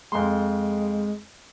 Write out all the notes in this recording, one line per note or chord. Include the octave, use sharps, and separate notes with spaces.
F2 G#3 C6